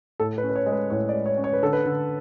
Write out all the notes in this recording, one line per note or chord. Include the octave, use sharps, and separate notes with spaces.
A2 A4
B4
C#4
B4
C#5
G#3
B4
A2 C#5
D5
G#3
C#5
C#4
C#5
B4
D3 A4
B4
D3